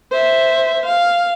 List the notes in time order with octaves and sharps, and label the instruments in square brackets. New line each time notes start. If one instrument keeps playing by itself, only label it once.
[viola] C5 E5
F5